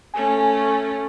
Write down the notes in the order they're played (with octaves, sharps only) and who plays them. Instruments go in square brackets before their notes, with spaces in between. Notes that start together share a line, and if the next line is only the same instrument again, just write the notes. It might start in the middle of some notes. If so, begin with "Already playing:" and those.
[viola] A3 C#4 [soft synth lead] G#5